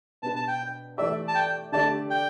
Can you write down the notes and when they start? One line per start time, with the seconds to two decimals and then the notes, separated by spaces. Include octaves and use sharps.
0.23 B2 B3 D4 B4 A5
0.36 A5
0.48 G5
0.98 E3 A3 G4 D5 E5
1.28 A5
1.35 G5
1.72 D3 A3 G4 D5 A5
2.10 G5